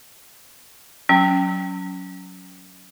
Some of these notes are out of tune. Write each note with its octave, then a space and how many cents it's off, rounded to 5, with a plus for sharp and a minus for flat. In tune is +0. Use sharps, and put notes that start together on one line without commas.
F#3 +0 C#4 +10 G5 +0